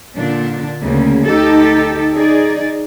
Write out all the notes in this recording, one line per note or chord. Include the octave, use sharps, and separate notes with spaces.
A#2 D3 D4
D2 C#3 A#3
D2 D#4 G4 A4
D#4 G#4 D5